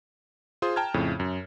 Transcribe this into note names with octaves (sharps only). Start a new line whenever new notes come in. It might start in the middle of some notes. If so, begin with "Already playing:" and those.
F4 G#4 C5 C6 D#6
G5 A5 A#5 F6 G#6
F2 A2 C#3
F#2